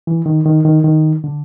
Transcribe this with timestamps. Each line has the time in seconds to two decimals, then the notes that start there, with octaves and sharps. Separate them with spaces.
0.07 E3
0.26 D#3
0.46 D#3
0.65 D#3
0.84 D#3
1.24 D3